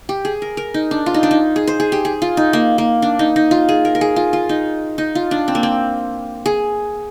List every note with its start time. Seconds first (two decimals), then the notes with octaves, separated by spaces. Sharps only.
0.09 G4
0.25 G#4
0.42 A#4
0.57 A#4
0.74 D#4
0.91 D4
1.06 F4
1.14 D#4
1.23 D4
1.31 D#4
1.56 G#4
1.67 C5
1.80 G#4
1.92 G4
2.05 G#4
2.22 F4
2.37 D#4
2.53 A#3
2.78 A#3
3.02 D4
3.19 D#4
3.36 D#4
3.51 F4
3.69 G#4
3.85 A#4
3.95 A#4
4.01 G#4
4.16 F4
4.33 F4
4.49 D#4
4.98 D#4
5.15 F4
5.31 D4
5.48 C4
5.55 A#3
5.63 C4
6.46 G#4